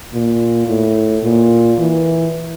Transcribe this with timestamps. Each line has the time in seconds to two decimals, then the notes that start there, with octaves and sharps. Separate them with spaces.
0.13 A#2
0.67 A2
1.23 A#2
1.78 E3